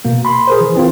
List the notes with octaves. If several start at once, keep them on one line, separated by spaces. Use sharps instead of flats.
B2 A#3
B5 C6
G#4 A#4 C5
E3
E3 C4 F4